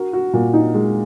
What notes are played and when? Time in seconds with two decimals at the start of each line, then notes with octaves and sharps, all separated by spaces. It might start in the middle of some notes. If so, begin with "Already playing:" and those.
Already playing: F#4 A#4
0.13 F#4
0.34 A#2
0.53 D#4
0.74 G#3